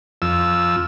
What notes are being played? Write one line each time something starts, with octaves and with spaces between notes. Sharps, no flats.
F2 E6